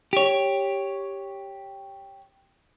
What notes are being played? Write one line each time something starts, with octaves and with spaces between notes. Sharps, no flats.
G4 C#5